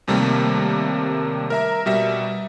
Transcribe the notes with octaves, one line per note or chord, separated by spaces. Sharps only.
D#2 C3 G3 A3 A#3
A#4 E5 A#5
B2 G3 E5